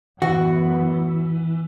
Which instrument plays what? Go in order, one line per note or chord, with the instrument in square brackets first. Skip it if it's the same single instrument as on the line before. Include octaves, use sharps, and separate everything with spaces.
[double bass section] A1 F#2 B3 [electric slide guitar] E3 [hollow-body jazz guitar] F#4